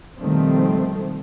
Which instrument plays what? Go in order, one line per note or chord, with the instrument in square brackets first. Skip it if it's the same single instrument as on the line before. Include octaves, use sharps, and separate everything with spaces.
[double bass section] B2 D#3 F3 G3 A3 C4